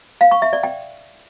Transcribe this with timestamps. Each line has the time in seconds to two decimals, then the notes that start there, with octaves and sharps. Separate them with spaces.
0.21 F5
0.31 C#6
0.42 E5
0.53 D5
0.63 G5